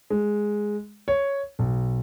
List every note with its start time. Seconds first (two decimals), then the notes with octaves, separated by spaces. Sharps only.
0.10 G#3
1.08 C#5
1.59 B1